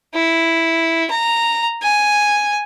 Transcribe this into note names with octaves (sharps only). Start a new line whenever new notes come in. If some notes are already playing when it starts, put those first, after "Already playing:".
E4
A#5
G#5